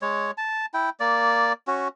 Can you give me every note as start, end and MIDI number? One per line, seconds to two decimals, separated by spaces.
0.02 0.31 56
0.02 0.31 73
0.38 0.66 81
0.74 0.90 64
0.74 0.90 79
1.00 1.53 58
1.00 1.53 74
1.67 1.88 61
1.67 1.88 66